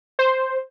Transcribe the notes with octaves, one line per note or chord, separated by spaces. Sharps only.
C5